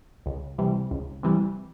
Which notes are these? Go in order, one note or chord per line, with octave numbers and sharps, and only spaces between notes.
C#2
C3 E3 G3
C#2
C3 E3 G3